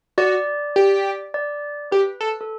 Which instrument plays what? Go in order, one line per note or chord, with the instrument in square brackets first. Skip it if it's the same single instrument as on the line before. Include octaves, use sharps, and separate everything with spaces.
[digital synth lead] F#4 [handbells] D5
[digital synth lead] G4
[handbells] D5
[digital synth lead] G4 [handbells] B4
[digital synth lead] A4
[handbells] A4